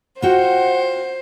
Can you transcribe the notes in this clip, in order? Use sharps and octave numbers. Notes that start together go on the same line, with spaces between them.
F4 F#4 C5 F#5 G5